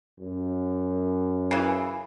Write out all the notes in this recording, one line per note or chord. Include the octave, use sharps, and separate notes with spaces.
F#2
C#3 E3